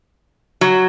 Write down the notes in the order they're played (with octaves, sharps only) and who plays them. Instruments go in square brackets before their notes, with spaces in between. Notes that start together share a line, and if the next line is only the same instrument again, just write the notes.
[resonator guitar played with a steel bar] F#3